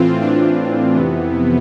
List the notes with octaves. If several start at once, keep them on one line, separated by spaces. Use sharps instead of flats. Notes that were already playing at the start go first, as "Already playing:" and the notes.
Already playing: A2 E3 C4 F4
D4
F2 C3 E3 B3